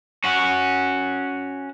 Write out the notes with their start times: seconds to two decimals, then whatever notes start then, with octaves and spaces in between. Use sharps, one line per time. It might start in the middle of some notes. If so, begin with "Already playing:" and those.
0.24 C#4 F#4